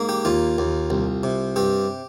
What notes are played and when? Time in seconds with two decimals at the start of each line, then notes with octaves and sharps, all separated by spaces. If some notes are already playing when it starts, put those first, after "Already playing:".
Already playing: G#2 A#3
0.09 G4
0.25 D#2 F4
0.58 D#2
0.90 C2
1.23 C3
1.56 G2 G4